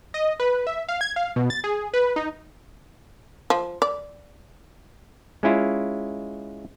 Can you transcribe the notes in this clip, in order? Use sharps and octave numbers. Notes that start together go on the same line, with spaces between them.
D#5
B4
E5
F5
G#6
F5
B2
A6
G#4
B4
D#4
F3
D5
G#3 C#4 E4 F4